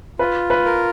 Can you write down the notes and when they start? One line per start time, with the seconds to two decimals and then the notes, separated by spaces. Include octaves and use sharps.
0.19 F4 B4
0.50 B4
0.65 A#4